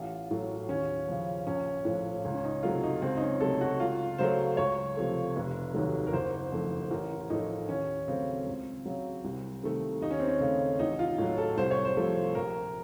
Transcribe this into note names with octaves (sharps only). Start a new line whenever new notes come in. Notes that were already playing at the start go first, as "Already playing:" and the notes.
Already playing: A1 F4
A2 F#3 A3
D#2 C#4
C#3 F3
A#1 C#4
A2 F3
C#2
C#4
D#4
C3 F#3 A3 F4
D#4
C#2 C4
D#4
C#4
C3 F#3 A3 A4
F#4
C#2 F4
C#3 F#3 A3 C5
C#2 C#5
C3 F3 A3
F1
D#2 D#3 F#3 A3
A#4
F#1 C5
F2 D#3 A3
A1 A#4
A2 F3 A3 D#4
D#2 C#4
C#3 F#3 A3 C4
C#2
C#3 F#3
C2
C3 D#3 A3
D#2 D#4
C#4
C4
C#4
C#3 A3
A1 D#4
F4
A2 F#3
A4
C2 C5
C#5
C5
C3 F3 A3
A#1 A#4